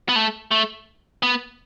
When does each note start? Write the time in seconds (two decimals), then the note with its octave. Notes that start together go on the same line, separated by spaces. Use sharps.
0.09 B3
0.16 A3
0.51 A3
1.23 B3